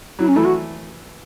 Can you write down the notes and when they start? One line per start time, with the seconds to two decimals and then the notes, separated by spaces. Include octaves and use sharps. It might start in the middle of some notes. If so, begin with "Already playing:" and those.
0.19 F#3 E4
0.28 C#4
0.36 E3 A3 E4
0.44 F#4